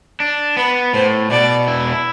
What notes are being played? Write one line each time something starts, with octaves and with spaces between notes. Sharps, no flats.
D4
B3 B4
A2 C5
B2 D5
E4